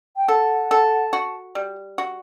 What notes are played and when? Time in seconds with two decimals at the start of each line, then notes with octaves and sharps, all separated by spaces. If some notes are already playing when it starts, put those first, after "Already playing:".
0.16 G5
0.28 A4 F#5
0.71 A4
1.13 F#4
1.55 G3
1.98 F#4